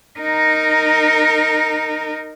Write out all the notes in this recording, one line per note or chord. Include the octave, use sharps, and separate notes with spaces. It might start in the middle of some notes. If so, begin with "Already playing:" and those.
D#4 A#4